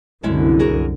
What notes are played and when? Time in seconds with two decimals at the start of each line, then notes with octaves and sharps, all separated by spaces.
0.23 C2 F#2 D3 G#3 C#4 E4
0.59 F#4 G#4 A#4